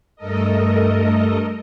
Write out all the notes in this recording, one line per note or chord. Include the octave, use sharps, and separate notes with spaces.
G2 A3 A4 A#4 D#5